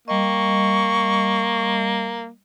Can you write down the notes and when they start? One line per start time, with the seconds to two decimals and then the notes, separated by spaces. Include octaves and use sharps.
0.08 G3 A#3 D#5 C#6